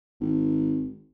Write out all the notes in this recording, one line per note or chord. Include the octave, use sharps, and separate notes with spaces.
G#1